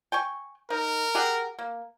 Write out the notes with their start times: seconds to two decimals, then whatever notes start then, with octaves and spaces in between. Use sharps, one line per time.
0.12 G5 G#5 C#6
0.70 D#4 A#4
1.15 G4 G#4 F#5
1.59 A#3